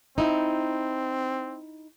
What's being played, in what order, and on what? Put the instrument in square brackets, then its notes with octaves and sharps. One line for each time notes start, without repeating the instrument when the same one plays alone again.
[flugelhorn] C4 [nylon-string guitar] D#4 E4